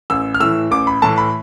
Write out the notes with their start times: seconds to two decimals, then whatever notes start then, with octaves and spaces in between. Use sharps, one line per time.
0.10 A1 E6
0.34 F6
0.40 A2 E3 E6
0.71 A1 D6
0.87 B5
1.02 A2 E3 A5
1.18 B5